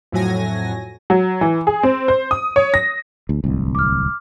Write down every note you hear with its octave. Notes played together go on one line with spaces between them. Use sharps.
F2 A2 F#3 G#5 A#6
F#3
E3
G#4
C4
C5
D#6
C#5
A#6
D2
D1 C2
D6 F6